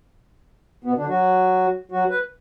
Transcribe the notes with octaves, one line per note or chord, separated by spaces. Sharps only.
B2 B3
D3 D4
F#3 F#4
F#3 F#4
B4